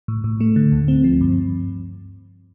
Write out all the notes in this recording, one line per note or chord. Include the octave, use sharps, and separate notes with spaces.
A2
A2
A3
D3
D2
C4
F3
G2